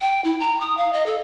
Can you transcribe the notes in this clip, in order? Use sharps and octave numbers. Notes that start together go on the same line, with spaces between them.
G5
E4
A#5
D#6
F5
D#5
A4